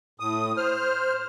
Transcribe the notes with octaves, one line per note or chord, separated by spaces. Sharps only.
A2 D#6
C5 F6